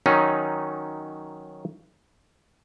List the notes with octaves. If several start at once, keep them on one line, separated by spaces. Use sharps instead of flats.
D#3 F#3 C#4 D#4